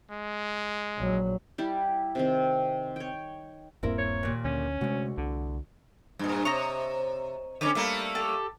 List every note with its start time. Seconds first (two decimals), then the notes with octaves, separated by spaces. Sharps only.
0.11 G#3
0.98 A#1 F#3
1.58 G3 E4 G4
2.15 C3 D#3 C4
2.96 C#5 G5
3.83 D#1 G2 A#3 C4 E4 A#4
3.98 C#5
4.23 D#2 A#2
4.45 D2 C#4
4.81 D2 C3 G#3 F#4
5.17 C2 D3
6.19 G2 A#2
6.45 C3 C#5 D#5 A#5
7.61 D3 C#4 B4 C#5 D6
7.75 G3 A3 A#3 B5
8.15 G4 A4